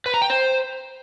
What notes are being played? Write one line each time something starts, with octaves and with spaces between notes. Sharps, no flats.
B4
A#5
G5
C5